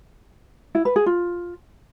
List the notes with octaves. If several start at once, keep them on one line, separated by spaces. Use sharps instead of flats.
E4
B4
G#4
F4